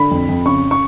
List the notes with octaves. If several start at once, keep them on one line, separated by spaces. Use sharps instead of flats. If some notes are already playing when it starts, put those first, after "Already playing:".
Already playing: D3 B5
F2
F2
C#3 C#6
C#6